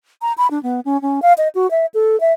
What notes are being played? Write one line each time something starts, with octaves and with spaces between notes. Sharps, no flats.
A#5
B5
D4
B3
C#4
C#4
F5
D#5
F#4
E5
A4
E5